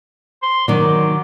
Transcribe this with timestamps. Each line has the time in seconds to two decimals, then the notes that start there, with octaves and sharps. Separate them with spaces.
0.42 C6
0.68 D#3 F#3 D5